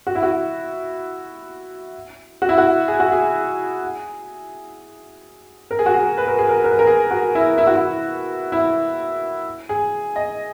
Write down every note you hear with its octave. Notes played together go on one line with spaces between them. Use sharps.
F#4
E4
F#4
F#4
E4
F#4
G#4
F#4
G#4
A#4
G#4
F#4
G#4
B4
A#4
G#4
A#4
A#4
B4
A#4
G#4
F#4
E4
E4
F#4
E4
E4
G#4
D#5